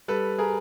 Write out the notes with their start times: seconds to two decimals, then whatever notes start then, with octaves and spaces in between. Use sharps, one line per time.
0.08 G3 A4 B4
0.38 G#4 A#4